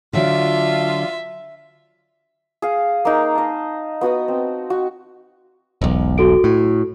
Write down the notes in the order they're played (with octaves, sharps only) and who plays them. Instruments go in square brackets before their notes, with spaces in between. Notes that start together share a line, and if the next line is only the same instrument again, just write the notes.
[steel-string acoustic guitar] D3 F#3 D4 [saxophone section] F4 [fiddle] E5
[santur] G#4 F5
A#3 D#4 G#4
D#5 A5
B3 F#4 B4 D#6
C4
F#4
[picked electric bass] E1 B1
[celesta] F#4 A4 D7
[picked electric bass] A2